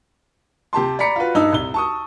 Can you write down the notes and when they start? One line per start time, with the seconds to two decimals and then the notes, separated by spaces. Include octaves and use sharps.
0.73 C3 G4 A5 C6
0.99 D5 A#5 B5 B6 C#7
1.16 F4 F#4 B4
1.35 G2 D#4 E6
1.53 C2 G7
1.74 A5 C#6 D#6